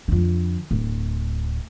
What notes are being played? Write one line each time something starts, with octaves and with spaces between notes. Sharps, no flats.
F2 D3
D1